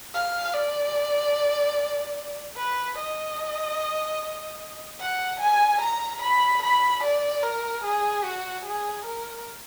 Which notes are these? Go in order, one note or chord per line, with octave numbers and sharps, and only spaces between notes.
F5
D5
B4
D#5
F#5
G#5
A#5
B5
B5
D5
A#4
G#4
F#4
G#4
A#4